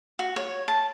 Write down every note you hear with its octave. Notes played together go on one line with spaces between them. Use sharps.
F#4
C#5
A5